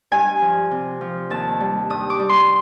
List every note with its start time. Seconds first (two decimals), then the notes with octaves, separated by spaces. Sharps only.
0.11 G2 G#5
0.41 F3
0.71 C3
1.01 F3
1.30 D#2 A5
1.60 G3
1.90 G2 D#6
2.10 D6
2.20 G3
2.29 C6